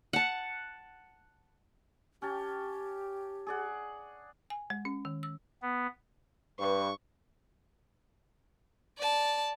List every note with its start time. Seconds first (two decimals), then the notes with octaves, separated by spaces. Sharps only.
0.13 F#5 A5
2.22 C#4 G4 G5 A5
3.47 G#4 D5 F#5
4.50 G#5
4.70 G#3
4.85 C#4
5.05 D#3
5.23 E6
5.62 B3
6.59 G2 B4 C#6
8.98 D5 A5